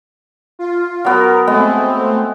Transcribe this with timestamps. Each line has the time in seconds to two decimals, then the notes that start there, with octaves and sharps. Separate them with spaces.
0.59 F4
1.05 F#3 B3 A#4
1.47 G#3 A3 B3 C4 D#5